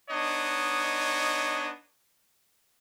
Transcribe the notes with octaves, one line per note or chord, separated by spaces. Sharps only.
B3 D4 D#4 C#5 D#5